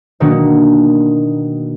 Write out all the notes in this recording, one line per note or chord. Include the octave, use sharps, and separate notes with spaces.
B2 D#3 A#3 D4 F#4